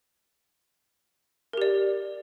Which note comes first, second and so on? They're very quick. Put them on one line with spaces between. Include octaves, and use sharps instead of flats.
A#4 G4 D5